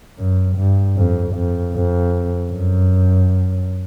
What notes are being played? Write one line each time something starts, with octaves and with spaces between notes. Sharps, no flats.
F#2
G2
F2
F2
F2
F#2